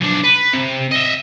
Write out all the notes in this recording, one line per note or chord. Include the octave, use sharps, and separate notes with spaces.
B1 D4
B4
C3
D#5 E5